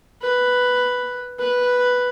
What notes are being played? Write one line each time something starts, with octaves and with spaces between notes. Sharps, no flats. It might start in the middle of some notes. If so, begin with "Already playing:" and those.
B4
B4